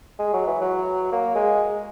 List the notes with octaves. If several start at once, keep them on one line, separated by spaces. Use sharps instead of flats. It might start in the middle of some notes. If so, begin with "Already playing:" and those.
G#3
F#3
E3
F#3
A#3
G#3